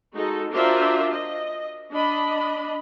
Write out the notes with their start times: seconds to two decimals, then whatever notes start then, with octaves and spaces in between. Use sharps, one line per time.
0.15 G#3 D#4 F#4 A4
0.52 D4 F4 F#4 A#4 C5 E5
1.13 D#5
1.92 D4 D#5 B5